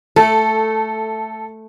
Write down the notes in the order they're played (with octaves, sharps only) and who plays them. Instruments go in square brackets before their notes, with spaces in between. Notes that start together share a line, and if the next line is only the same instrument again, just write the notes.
[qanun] A3 [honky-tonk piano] A4